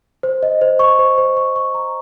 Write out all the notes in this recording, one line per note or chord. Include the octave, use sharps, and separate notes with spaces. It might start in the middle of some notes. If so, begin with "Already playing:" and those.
C5
D#5
C5
C#6
C5
C5
C#6
C#6
A#5